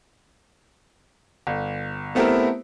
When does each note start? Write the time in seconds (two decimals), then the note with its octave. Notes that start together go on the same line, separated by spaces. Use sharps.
1.47 G1
2.15 A3 B3 C4 E4 G4 A#4